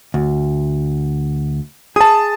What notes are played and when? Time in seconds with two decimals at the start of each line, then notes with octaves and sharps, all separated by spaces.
0.14 D2
1.96 G#4 A5 D#6